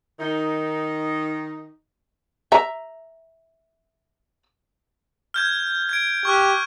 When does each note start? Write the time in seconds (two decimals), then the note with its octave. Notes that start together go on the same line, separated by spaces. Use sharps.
0.20 D#3 D#4
2.52 E5 A#5
5.34 F6 G6 G#6
5.89 G#6 D7
6.25 G4 C#6 F6 F#6